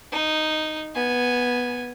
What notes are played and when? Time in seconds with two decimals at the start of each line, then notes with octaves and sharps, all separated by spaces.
0.12 D#4
0.95 B3 G#5